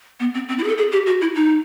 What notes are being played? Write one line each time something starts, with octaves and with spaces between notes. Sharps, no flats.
B3
C4
C4
E4
G#4
A4
G#4
G4
F#4
E4
D#4